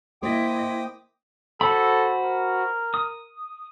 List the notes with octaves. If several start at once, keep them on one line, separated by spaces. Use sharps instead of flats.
A#3 E4 C5 D#5 G5 D6 D#6
F#4 A4 C5 B5
A#4
D#6